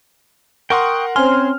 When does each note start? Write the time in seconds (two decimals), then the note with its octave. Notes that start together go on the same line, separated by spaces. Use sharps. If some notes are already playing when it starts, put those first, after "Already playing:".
0.70 A#4 F#5 G5 C6 C#6 D#6
1.16 C4 C#4 C5 G#5 C6 F6